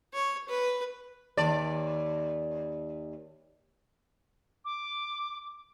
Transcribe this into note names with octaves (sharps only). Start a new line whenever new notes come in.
C#5
B4
D#2 D5
D6